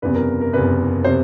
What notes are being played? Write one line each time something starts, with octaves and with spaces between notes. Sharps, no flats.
F#1 E2 C3 B4
A#4
A#4
F#1 E2 C3 B4
C3 C5